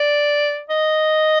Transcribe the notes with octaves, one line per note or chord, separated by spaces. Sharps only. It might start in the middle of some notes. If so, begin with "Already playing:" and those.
Already playing: D5
D#5